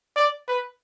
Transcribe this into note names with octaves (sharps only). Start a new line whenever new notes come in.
D5
B4